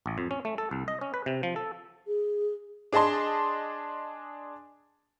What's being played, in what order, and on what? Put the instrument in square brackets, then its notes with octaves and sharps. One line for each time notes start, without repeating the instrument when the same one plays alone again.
[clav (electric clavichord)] A1
F2
C#4
A3
A4
C2
D#5
C#4
B4
C3
F3
A4
[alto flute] G#4
[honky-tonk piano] D4 G#4 D#5 A5 C6